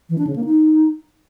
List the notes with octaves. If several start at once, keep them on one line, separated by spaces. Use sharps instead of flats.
E3
D4
C#3
A#3
D#4